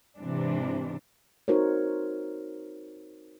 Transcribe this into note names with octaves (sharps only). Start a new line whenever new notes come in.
G#2 C3 E3 D4
C4 D#4 F#4 A#4 C5 C#5